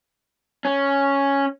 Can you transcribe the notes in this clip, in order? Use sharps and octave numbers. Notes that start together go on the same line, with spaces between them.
C#4